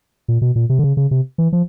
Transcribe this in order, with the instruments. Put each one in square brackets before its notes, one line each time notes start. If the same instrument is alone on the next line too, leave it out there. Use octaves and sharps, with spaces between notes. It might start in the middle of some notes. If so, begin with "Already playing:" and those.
[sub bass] A#2
B2
A#2
C3
D3
C#3
C#3
C3
E3
F3